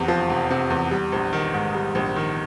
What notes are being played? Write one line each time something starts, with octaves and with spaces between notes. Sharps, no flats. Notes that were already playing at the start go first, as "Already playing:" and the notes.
Already playing: F1 E2 C3
F3
F1
C3
E2
G3
A#1
D#3
G#2
G3
A#1
D#3